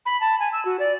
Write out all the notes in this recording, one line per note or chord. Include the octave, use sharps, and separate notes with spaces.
B5
A5
G#5
E6
F#4
D5